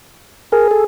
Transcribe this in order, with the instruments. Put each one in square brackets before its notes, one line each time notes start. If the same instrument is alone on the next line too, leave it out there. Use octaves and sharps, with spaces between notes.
[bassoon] G#4 [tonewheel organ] A#4
[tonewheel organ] A4